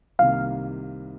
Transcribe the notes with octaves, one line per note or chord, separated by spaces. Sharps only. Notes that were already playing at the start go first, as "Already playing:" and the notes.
C2 C3 D#3 A#3 F5